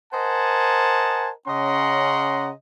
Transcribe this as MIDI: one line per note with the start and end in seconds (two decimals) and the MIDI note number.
0.13 1.29 70
0.13 1.29 72
0.13 1.29 75
0.13 1.29 78
0.13 1.29 80
0.13 1.29 81
1.47 2.50 49
1.47 2.50 61
1.47 2.50 75
1.47 2.50 78
1.47 2.50 82
1.47 2.50 84